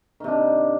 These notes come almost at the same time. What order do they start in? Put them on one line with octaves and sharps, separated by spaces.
D#3 C3 D4